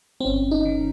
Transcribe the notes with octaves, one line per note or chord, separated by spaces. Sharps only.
C4
G1 C#4
D#4
D#3